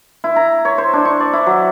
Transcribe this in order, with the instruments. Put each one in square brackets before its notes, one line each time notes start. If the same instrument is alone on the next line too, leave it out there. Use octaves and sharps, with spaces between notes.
[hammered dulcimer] E4
A#5
C#5
C5
D4
C#6
D5
E4
F#3